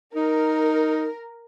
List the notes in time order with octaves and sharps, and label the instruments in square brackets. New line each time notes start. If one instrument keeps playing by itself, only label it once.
[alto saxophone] D#4 [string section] A#4